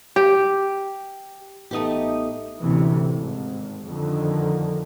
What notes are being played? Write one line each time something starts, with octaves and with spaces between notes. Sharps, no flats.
G4
A1 A3 B3 D#4 G4 D#6
A1 D2 C3 E3
G#1
F2 D3 D#3